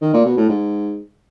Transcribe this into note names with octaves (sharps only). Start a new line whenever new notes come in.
D#3
A#2
B2
A2
G#2